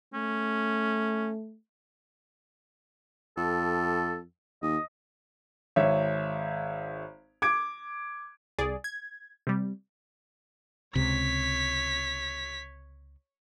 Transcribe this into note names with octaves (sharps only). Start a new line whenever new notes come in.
A3 C#4
F2 A4
D#2 D#5
G#1 C#5 E5
D6 G#6 D7
C2 G#4 D5
G#6
C3 G3
C#2 C3 C#5 B6